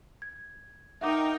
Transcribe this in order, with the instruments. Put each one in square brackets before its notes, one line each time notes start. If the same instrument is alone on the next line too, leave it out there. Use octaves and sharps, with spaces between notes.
[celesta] G#6
[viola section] D#4 A#4 G5 [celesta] E5 F#5 D6